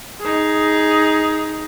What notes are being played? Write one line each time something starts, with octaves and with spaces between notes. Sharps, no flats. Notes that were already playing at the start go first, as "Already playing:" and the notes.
D#4 G#4